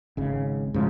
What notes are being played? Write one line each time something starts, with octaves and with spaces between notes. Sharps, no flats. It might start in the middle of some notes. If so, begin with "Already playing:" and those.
G#1 C#3
G#2 C#3 F3